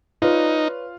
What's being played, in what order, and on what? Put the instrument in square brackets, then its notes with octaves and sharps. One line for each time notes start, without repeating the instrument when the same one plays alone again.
[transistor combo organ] D#4 [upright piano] F4 [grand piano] B4 C#5 D5